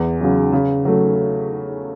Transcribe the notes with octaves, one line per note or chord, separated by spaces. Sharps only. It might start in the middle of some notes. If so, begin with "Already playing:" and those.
Already playing: E2
C#3 F#3
C#3
F#3 A3